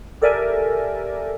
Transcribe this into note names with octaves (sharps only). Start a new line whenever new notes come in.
G4 A4 A#4 D5 E5 G#5